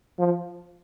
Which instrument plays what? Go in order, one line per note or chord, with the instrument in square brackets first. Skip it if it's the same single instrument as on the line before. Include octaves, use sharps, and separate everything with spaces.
[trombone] F3